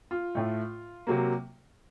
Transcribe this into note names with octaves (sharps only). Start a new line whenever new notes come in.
F4
A2 A3
C3 F#3 A#3